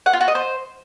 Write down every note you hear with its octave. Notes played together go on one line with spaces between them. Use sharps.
F#5
F4
F#4
D#5
C5